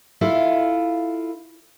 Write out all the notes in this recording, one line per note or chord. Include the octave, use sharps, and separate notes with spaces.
E4 F4 A4 F5